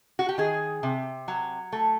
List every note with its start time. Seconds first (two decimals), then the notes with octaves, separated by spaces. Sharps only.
0.19 F#4
0.29 G4
0.38 D#3 G#4
0.83 C3
1.28 F#3
1.73 A3